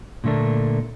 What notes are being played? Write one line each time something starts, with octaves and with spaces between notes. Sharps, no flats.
A#2 D3 A3 A#3 D4